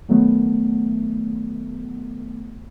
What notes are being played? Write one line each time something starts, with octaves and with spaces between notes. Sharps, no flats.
D#3 F#3 A3 B3